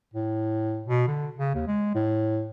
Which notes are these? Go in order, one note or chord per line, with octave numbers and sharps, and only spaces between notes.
A2
B2
D3
C#3
D#2
G#3
A2